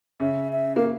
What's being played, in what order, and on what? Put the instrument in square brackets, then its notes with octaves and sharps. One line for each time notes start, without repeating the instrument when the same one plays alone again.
[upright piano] C#3 C#4 [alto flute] E5
[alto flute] E5
[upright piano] A#3 [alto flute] F5